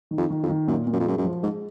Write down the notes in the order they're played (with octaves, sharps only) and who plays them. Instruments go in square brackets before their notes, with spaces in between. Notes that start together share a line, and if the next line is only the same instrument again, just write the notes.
[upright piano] D#3
[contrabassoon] F2
[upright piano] D#3
[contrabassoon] F2
[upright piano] D#3
[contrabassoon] F#2 [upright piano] A#2
[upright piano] A#2
[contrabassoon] F#2
F2
[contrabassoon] F#2 [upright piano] G#3
[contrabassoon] F#2
[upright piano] F3
[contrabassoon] G#2 [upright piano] G#3